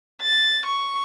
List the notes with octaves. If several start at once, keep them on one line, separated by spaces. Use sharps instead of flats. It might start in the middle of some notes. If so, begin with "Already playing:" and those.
A6
C#6